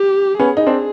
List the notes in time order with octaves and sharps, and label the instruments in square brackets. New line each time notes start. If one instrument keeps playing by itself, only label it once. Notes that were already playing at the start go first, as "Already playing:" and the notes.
Already playing: [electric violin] G4
[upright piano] B3 C#4 [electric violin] G#4
[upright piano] D#4
C4 D4